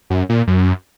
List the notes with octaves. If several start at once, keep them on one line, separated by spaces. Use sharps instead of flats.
F#2
A#2
F#2